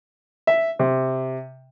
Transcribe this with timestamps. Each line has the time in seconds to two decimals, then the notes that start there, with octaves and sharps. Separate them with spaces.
0.47 E5
0.79 C3